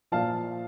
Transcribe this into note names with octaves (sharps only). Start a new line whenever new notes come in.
A#2 F3 F5 A5